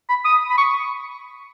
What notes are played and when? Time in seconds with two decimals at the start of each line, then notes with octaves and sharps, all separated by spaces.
0.09 B5
0.25 D#6
0.49 B5
0.58 C#6